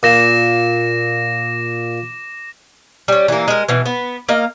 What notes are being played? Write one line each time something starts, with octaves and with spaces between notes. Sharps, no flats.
A#2 D6 A#6 E7
G3 C#4
E3 A#3
G#3 A#4
B2 E3
B3
A#3 D#5 F5